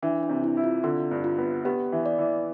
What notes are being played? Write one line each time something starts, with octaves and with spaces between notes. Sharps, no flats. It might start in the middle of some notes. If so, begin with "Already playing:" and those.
E3 D4
D4
C3
E4
E4
F4
D3 F4
G2
F4
B3
B3 G4
E3
D5
E3